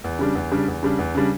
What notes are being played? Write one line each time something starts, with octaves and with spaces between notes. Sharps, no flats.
E2
C#3 G3 D4
E2
C#3 G3 D4
E2
C#3 G3 D4
E2
C#3 G3 D4